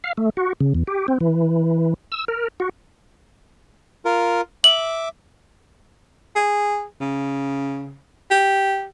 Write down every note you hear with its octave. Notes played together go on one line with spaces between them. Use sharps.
F5
A3
F#4
C#3
E2
G4
C4
E3
E6
A#4
F#4
F4 A#4
E5 D6 F#7
G#4
C#3
G4